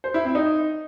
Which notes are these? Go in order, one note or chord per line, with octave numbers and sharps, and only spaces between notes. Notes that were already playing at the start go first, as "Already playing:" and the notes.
C5
E4
C4
D#4